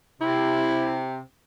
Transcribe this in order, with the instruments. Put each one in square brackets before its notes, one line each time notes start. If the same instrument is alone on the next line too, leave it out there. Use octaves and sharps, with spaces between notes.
[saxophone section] C3 [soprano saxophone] E4